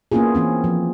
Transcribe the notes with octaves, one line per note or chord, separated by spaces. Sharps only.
A#3 B3 C#4 E4 F4 G#4
E3 C4 C#4
F3